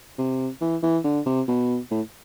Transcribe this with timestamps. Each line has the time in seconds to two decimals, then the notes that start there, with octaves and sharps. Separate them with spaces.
0.18 C3
0.61 E3
0.83 E3
1.05 D3
1.27 C3
1.48 B2
1.91 A2